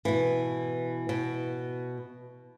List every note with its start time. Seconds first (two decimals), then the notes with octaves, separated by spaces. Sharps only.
0.05 B2 E3
1.09 B2